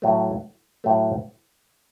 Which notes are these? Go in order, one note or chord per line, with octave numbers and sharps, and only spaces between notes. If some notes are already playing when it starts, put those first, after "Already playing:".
A2 F#3 A3
A2 F#3 A3